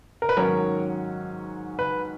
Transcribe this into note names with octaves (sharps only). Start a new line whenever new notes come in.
A#4
B4
G#2 D#3 F#3 C#4 A#4 C#5
B4